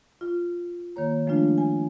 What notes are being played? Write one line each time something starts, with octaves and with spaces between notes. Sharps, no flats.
F4
D#3 A#3 C#5 A#5
F3 G#3 A3 D4 F4
G#5